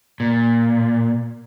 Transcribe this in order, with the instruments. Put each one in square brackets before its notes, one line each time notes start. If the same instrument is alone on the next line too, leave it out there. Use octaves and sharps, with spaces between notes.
[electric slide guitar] A#2